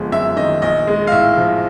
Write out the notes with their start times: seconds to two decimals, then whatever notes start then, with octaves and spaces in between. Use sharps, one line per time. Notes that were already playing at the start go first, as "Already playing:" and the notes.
Already playing: G1 F3 G#3
0.12 F#2 E5
0.37 D#3 D#5
0.62 A#1 D#5
0.87 G#3
1.07 F5
1.12 A2 E5
1.37 F3